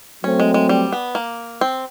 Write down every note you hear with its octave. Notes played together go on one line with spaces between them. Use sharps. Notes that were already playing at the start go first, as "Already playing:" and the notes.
F#3 A3 C4 C#4
G#3
G#3
G3
B3
A#3
C4